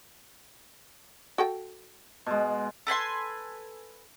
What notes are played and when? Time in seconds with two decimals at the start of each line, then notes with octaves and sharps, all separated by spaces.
1.38 F#4 A4 G5
2.26 B2 G#3
2.87 A4 B4 G#5 C6